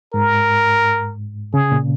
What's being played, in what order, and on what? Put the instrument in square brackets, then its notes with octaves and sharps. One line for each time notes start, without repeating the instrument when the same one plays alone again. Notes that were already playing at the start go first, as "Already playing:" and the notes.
[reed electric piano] G#2 [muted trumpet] A#4
[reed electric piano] C#3 [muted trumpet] G#4
[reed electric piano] A#2